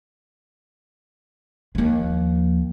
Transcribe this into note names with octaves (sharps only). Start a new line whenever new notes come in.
D#2 F3